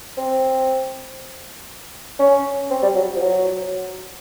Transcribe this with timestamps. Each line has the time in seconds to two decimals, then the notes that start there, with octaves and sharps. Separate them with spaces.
0.17 C4
2.19 C#4
2.71 C4
2.82 G3
2.95 F#3
3.16 F3
3.21 F#3